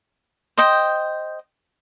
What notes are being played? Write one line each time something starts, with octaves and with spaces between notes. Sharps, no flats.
C5 D#5 G5